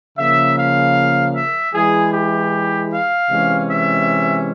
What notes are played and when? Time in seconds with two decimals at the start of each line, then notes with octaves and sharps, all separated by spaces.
0.17 C#3 F3 A#3 E5
0.56 F5
1.34 E5
1.74 E3 G#3 E4 G#4
2.13 G4
2.92 F5
3.30 C3 E3 G#3 C#4
3.70 E5